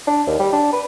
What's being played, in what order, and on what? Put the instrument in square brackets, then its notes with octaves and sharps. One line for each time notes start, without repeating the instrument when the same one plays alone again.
[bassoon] D4
D#2
G3
D4
B4